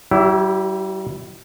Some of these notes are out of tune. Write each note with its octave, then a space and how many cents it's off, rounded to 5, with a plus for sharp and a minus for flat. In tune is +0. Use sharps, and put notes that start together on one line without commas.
G3 -45 E4 +0 G4 +10